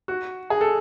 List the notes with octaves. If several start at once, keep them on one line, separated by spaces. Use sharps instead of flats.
F#4
G#4
A4